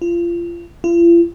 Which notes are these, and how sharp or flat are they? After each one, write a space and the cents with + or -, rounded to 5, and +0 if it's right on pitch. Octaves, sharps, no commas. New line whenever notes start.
F4 -30
F4 -45